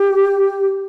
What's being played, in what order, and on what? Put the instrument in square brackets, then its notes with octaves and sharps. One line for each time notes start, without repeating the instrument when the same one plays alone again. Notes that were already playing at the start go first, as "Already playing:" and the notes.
Already playing: [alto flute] G4